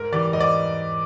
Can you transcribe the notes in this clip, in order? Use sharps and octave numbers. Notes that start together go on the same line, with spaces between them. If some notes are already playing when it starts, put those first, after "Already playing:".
Already playing: G#2 A#4
E3 G3 D5
G#2 D#5
D5